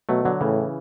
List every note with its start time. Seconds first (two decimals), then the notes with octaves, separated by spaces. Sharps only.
0.09 B2 F#3 A3
0.25 D3 F#3
0.41 A2 C#3 E3